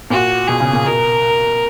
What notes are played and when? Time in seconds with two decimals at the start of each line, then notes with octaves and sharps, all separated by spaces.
0.10 A#2 F#4
0.47 B2 G#4
0.60 C#3
0.73 A#2
0.85 B2 A#4